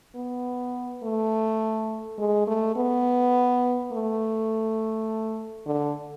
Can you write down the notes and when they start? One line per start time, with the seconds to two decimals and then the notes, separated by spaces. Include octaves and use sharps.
0.15 B3
1.03 A3
2.18 G#3
2.47 A3
2.76 B3
3.93 A3
5.66 D3